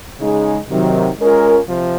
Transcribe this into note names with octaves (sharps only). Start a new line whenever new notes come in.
C#3 G#3 D#4 G#4
C3 D#3 F#3
G#3 C#4 F4 A#4
C3 F3